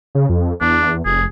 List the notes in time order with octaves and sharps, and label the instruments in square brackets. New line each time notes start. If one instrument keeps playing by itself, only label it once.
[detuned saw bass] C#3
F2
[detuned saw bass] E2 [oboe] D4
[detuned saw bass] F1 [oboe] G#4